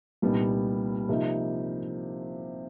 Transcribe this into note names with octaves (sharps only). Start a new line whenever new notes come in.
C2 A#2 G3 B3 D#4
C3 F3 A#3 D#4